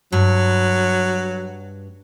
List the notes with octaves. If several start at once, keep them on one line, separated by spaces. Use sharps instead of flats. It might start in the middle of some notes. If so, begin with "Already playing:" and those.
G2 F#3